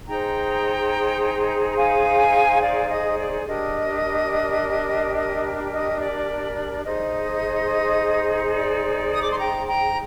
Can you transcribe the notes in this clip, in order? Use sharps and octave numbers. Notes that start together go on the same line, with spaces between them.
D#4 G#4 C5 G5 A#5
A#5
F5 G#5
D5 F5
D#5
D5
D4 G4 A#4 D#5
D#5
D#5
D5
D5
D#4 G#4 C5 D#5
D5
D#6
D6
C6
G5 A#5
G5 A#5